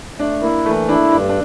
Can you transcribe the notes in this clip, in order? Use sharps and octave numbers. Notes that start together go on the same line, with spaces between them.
A3 D4
A#3 E4
E3 A3
D4 E4
G2 D4
D4